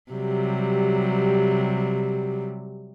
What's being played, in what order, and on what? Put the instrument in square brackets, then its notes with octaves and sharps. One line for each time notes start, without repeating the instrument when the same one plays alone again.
[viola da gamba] C3 F#3 G3